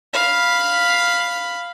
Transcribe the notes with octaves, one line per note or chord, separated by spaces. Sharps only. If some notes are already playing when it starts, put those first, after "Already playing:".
F5 B5